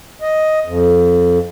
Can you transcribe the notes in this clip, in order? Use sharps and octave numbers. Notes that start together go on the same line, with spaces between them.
D#5
F2